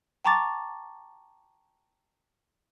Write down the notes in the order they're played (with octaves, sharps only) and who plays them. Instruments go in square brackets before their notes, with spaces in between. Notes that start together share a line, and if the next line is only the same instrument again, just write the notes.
[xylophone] G5 A5 A#5 C#6 D6 A6